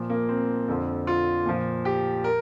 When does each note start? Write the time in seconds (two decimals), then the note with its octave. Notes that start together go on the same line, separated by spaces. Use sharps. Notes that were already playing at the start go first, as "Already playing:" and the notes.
Already playing: A#2 F3
0.10 A#3
0.29 C4
0.68 F2 D3 F3
1.07 F4
1.46 A#2 F3
1.85 G4
2.24 A#4